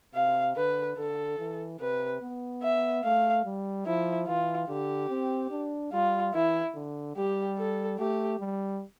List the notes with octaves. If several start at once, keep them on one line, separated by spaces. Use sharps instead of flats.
C3 F5
D3 B4
D3 A4
E3
C3 B4
B3
E5
A3 F5
G3
F3 E4
E3 F4
D3 G4
C4
D4
G3 F4
E3 E4
D3
G3 G4
A4
A3 G4
G3